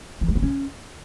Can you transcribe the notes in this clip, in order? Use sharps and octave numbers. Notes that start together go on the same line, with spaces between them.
E3
G#3
B3
C#4